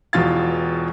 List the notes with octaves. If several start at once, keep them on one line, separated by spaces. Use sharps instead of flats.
E1 E2 B2 F4 F5 A6